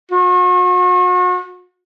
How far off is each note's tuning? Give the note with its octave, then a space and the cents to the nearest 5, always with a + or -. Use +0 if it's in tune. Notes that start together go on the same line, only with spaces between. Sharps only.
F#4 -40